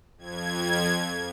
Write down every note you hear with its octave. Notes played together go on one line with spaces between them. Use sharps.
F2 G#6